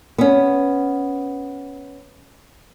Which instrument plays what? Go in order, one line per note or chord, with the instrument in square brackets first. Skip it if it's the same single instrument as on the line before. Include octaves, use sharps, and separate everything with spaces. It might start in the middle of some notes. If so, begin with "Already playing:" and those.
[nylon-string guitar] B3 C#4